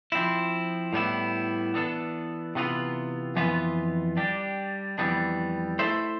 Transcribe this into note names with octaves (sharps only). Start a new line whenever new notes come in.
F3 C4 E4
A2 G3 B3 E4
E3 B3 D4 A4
C3 E3 B3 F4 B4
F2 E3 B3 F4 B4
G3 D4 G4
F2 E3 G3 B3 D4
A3 E4 A4 C5 E5